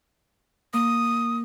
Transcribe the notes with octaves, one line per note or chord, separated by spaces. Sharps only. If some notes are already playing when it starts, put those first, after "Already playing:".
A#3 D#6